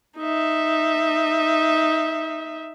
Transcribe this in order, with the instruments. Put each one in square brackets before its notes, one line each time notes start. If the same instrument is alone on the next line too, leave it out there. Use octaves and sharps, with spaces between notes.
[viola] D#4 E5